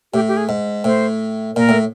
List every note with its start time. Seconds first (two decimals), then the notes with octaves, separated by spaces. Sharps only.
0.13 A2 G4
0.28 G4
0.37 G#4
0.49 G#2
0.84 A2 C5
1.56 A#2 A#4
1.69 A2